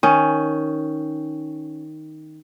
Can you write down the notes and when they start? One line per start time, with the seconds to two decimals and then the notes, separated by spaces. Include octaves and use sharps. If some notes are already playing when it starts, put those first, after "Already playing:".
0.03 D#3 C#4